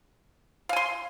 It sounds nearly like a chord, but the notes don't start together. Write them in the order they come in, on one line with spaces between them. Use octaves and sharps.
F5 G#5 C6